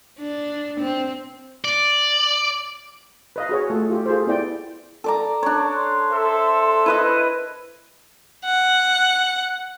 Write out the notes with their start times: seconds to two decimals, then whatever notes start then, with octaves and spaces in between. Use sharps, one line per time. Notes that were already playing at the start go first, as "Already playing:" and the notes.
0.19 D4
0.81 C4
1.65 D5
3.36 B4 D#5 F5
3.49 F#4 G#4 C#5
3.70 A3 F4 A4
3.90 F4 G4
4.06 F4 G#4 A4 C5
4.27 B3 E4 D5 G5
5.04 A4 D5 A#5
5.43 D4 C#5
5.75 C6
6.11 A4 C5 E5
6.86 E4 B4 D#5 D#7
8.45 F#5